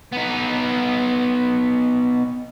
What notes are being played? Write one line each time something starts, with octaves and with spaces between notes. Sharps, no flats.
B3 D#4